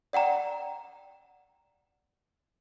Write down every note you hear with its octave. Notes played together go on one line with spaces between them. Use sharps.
D5 F#5 G5 A#5